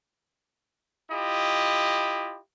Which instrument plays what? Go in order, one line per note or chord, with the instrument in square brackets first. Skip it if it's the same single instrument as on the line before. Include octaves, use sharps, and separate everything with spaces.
[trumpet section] E4 F4 G4 D#5